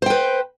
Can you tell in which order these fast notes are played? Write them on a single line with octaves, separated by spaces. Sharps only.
C5 G5 B4